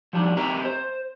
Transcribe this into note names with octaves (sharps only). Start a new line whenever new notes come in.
F3 G3 D4 D#4
C4 G4 A#4 D#5 E5 A#5
C5